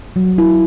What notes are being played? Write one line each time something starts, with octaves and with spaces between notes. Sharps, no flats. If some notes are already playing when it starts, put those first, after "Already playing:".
F#3
E4